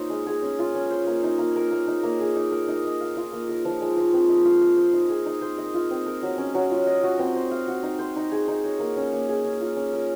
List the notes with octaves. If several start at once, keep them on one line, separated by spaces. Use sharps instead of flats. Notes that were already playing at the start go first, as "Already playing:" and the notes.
Already playing: A#3 D#4 F4 C5 C#5
G#3
G#4
C#4
F4
C#4
C5
A#3
D#4
A#3
A#4
A#3
D#4
A#3
G#4
D#4
A#4
D#4
D#5
F5
F4
A#3
A#4
F3
G#3
F3
C4
D#5
F4
A#3
C5
D#4
G#4
D#4
C5
D#5
F4
C4
A#4
F#3
C#4
F#3
F4
D#5
F#4
C4
C5
F5
F#4
D#4
C5
D#4
G#4
D#4
C#5
A#3
C#4
A#3
G#4
C#4
F4
C#4
A#4